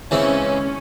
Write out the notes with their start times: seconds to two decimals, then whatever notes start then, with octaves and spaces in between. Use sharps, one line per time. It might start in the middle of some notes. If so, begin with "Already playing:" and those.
0.11 C#3 E3 G#3 C4 C#4 E4